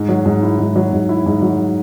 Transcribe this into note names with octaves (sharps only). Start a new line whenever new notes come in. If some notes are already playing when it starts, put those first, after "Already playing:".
Already playing: G#2
F#3
G#2
E4
G#2
F#3
G#2
E4
G#2
F#3